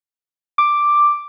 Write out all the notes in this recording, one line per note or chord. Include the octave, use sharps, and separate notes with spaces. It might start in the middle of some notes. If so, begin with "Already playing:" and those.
D6